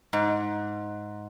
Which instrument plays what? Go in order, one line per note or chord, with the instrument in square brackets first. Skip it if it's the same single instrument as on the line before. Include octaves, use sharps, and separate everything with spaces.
[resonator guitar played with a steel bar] G#2